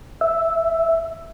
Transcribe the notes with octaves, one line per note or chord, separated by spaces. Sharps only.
E5